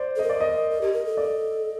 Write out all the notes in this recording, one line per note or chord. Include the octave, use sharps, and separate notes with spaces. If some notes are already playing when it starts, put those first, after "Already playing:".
Already playing: C5 D5
A4
A#4 D#5
D5
D#5
A#4
G4
A#4
A4
D5